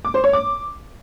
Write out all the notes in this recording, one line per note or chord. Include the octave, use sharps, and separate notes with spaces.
D6
C5
C#5
D6